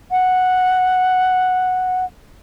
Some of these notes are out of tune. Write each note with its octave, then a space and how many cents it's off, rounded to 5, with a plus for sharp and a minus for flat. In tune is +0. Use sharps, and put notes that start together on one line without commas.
F#5 -5